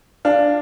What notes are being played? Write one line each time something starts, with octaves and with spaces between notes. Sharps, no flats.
D4 F5